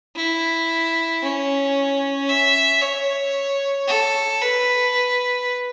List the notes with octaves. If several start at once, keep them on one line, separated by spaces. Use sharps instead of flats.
E4
C#4
E5
C#5
A4
B4